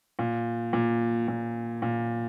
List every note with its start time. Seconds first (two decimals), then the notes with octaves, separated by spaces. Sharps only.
0.19 A#2
0.73 A#2
1.28 A#2
1.82 A#2